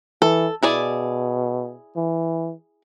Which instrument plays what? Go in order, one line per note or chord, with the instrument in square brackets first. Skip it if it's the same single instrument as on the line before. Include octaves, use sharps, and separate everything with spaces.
[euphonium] E3 [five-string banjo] A4
[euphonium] B2 [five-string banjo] E4 G#4 D5
[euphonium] E3